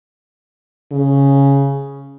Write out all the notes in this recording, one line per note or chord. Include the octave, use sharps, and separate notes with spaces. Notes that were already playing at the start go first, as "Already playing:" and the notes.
C#3